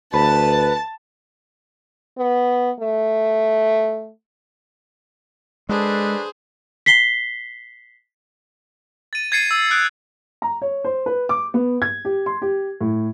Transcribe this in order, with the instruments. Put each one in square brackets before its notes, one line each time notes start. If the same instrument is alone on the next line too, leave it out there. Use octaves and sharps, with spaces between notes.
[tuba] D2 [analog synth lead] B4 [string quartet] A5
[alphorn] B3
A3
[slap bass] G#3 [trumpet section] D4 A4 B4 [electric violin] G#4 C5
[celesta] B6 C7 G7
[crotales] A6 D#7
G#6 A6 C7 C#7 D#7
E6
D#6 F#6 G6 D7
[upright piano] A#5
C#5
C5
B4
D6
B3
G#6
G4
C6
G4
A2